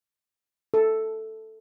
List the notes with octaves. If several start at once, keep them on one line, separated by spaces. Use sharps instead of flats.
A4